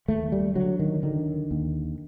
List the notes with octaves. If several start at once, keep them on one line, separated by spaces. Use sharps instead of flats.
D#2 A3
G3
D3 F#3
D#3
D3 D#3
D#2